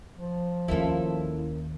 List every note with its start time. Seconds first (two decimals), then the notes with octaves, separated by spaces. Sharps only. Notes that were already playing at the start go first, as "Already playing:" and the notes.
0.17 F3
0.68 D#2 A#3 C#4 E4 F4 A4